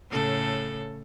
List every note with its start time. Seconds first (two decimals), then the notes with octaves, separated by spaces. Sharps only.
0.11 A2 C#3 A4